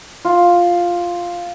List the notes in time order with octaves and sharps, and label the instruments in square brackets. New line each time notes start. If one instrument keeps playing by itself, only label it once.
[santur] F4